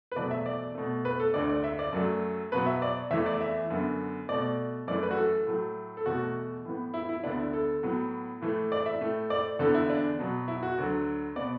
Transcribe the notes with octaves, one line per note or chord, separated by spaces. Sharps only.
B4
E2 B2 F#3 A3 D5
E5
D5
B2 A3
B4
A4
D2 D3 A3 D5
D5
E5
D5
F#2 F#3 A3
B2 F#3 B3 B4
E5
D5
E2 E3 A3 E5
D5
E5
F#2 D3 B3
B2 A3 D5
F#2 E3 A3 D5
B4
F#4
A4
A2 F#3 A3
A4
E2 B2 A3 F#4
A2 E3 B3
E4
E4
D2 D3 B3 D4
E4
A4
A2 F#3 B3
A2 E3 A3
D5
E5
A2 A3
D5
E2 D3 B3 A4
E4
D4
B2 F#3 B3
E4
F#4
D2 D3 F#3
B2 B3 D5